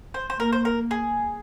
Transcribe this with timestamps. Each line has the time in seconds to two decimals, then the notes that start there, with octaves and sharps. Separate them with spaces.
0.14 C5
0.30 C5
0.39 A#3 A#4
0.53 C5
0.65 A#4
0.91 G#4